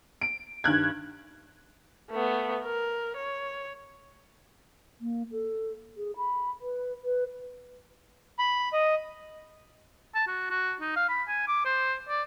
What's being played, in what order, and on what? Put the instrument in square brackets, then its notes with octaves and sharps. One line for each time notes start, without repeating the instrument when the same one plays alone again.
[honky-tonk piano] D7
G2 D#3 F#6 G#6
[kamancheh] A3 B3
A#4
C#5
[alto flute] A#3
A4
G#4
B5
B4
B4
[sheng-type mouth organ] B5
D#5
[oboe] A5
F#4
F#4
D#4
F5
B5
G#5
D6
C5
D5